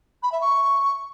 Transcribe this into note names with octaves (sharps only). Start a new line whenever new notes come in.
B5
E5
C#6